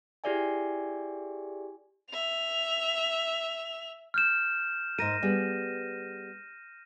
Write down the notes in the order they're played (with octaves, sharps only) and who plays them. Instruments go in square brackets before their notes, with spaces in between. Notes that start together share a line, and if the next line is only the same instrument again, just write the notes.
[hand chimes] E4 G4 G#4 D5 E5 G#5
[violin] E5 F7
[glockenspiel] F6 G6 E7
[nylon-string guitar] G#2 A#4 [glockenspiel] A#6 D#7
[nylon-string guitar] G3 B3 G#4